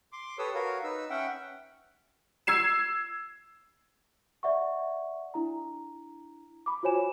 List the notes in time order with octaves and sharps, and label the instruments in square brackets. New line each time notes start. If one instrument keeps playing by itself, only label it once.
[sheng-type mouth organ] C6 D6
G4 A4 B4 C#5 D#6 E6
F#4 A#4 B4 C#5 F5
D#4 B4 E6
C#4 E5 F#5 G5
[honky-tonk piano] E6 G#6 C7 E7
[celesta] D5 E5 F#5 C#6
D4 E4 A#5
B5 D6
F4 F#4 C5 C#5 G#5 E7